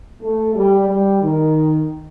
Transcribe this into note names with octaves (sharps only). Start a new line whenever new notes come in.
A3
G3
G3
D#3